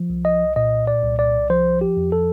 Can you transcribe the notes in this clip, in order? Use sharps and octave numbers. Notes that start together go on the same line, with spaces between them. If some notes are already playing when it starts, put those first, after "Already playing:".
Already playing: F3
C2
D#5
A#2 D#5
D5
C2
D5
F3 C5
G4
F2
A4